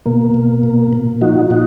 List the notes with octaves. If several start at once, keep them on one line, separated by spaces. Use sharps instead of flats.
B2 A#3
B2
A#2
A#2
F3 D#4 F#4
A#2 D#4 F#4